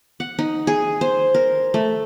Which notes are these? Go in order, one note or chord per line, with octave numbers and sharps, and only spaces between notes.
F#5
D#4
G#4
C5
A#4
A3